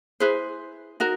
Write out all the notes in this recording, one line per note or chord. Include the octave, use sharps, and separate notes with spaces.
E4 G#4 B4 C5
D#4 F#4 A#4